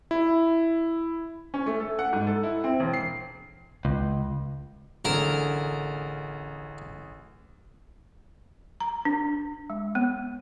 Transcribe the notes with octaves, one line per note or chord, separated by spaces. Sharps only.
E4
C#4
A3
A4
F#5
G#2
A4
E4
C4
E1
C7
C#2
A1 D3 G#4 A#4 A#5 E7
A#5
D4
G#3
B3